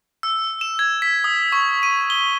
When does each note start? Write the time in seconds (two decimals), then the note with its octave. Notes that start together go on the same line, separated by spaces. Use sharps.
0.23 E6
0.61 E7
0.79 G#6
1.02 B6
1.24 D#6
1.52 C#6
1.83 D#7
2.10 G7